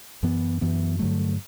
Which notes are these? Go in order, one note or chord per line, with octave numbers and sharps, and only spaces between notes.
F#2 E3 B3
F#2 E3 B3
G2 D3 F#3 A3